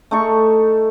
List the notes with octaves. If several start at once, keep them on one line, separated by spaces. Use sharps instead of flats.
A3 D#4 A4 C#6